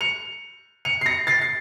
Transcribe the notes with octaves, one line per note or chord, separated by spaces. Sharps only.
C#7 F7
C#7 F7
C7
A#6 C#7
A6 C7
C7